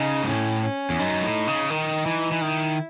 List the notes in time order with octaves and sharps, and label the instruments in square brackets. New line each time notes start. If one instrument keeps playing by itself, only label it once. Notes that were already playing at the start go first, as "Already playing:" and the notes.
Already playing: [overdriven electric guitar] C#3 [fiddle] D#4
[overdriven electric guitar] G#2
[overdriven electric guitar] A2 [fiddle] C#4
[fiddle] C#4
[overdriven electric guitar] E2
[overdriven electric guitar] F#2 [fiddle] D#4
[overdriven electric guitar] A2
C#3
[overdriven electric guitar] D#3 [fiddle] D#4
[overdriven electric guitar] E3
E3
[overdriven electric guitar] D#3 [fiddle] E4